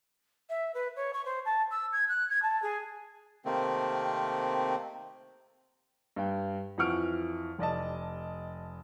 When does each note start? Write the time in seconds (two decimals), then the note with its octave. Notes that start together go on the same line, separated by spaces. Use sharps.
0.49 E5
0.74 B4
0.96 C#5
1.13 C#6
1.25 C5
1.45 A5
1.71 E6
1.93 G#6
2.08 F#6
2.29 G#6
2.42 A5
2.62 G#4
3.45 C3 D#3 A3 A#3 C4
6.16 G2 G5
6.78 F2 E3 F#5 C#6 F6 D7
7.59 F1 D5 D#5 A5